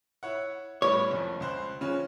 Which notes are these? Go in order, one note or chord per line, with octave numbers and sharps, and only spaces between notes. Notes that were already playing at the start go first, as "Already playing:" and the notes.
E4 C#5 F#5
A2 G3 B3 C#5
F#1 F2
C#2 C5 F#6
C#3 F3 C#4